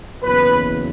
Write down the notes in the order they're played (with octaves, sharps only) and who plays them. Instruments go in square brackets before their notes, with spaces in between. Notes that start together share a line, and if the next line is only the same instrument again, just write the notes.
[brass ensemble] F#1 E2 B2 F#3 B4